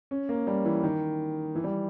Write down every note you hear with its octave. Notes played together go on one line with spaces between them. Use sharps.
C#4
A#3
G3
E3
D#3
E3
G3